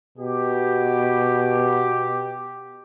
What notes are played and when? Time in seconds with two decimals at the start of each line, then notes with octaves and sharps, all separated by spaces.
0.17 B2 G4